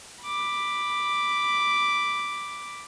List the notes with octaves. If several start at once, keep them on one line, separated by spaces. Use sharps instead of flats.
B5 D6